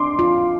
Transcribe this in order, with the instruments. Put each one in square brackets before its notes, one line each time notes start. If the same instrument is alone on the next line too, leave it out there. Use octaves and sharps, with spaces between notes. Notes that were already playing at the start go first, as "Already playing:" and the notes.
Already playing: [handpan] D4 [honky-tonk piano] C6 D6
[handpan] F4